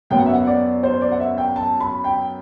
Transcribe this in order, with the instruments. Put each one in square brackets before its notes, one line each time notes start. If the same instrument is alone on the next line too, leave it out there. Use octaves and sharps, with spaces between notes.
[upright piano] F#2 F#3 B3 G5
F#5
E5
F#5
D5
C5
D5
F#5
E5
G5
A5
B5
G5